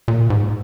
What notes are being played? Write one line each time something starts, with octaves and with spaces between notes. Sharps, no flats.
A#2
G#2